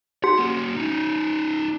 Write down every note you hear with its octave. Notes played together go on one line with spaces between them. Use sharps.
F#4 F#5
A#3 C#4
C#4 D#4